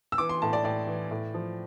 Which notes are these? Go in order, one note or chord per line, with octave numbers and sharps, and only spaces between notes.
E6
E3 D6
C6
A2 A5
D5
A2 D5
E3
A2
F3